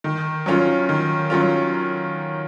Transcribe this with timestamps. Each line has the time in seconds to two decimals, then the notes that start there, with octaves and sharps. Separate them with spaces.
0.04 D#3
0.46 F#3 C#4 F4
0.89 D#3
1.30 F#3 C#4 F4